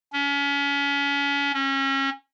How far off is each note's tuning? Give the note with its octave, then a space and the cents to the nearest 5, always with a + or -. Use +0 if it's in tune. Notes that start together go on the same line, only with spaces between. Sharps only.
C#4 +35
C#4 -30